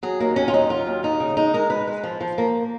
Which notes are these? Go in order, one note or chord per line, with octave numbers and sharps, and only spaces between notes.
F#3 G#4
D#2 A#3
D#2 C#4
F4
F#3 D#4
F#3 F4
D#2
D#2 D#4
C#3
G#3 D#4
G#3 A#4
G#3 B4
G#3
F3
F3
A#3